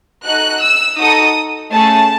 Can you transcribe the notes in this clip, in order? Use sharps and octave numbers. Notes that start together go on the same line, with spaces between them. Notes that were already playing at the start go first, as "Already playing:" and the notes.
D#4 F#4 A4 F#6
E6
D#4 F#4 A4 D#6
A3 C#4 G#4 A5